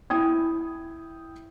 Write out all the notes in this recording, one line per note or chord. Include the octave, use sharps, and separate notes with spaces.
E4 G5 D#6 G#6